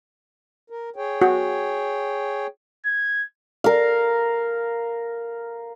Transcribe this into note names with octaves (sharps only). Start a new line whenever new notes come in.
A#4
G#4 C#5 G5
F#4
G#6
A#4 F5